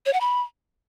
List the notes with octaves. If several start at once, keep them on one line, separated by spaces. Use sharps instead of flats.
C#5
F#5
B5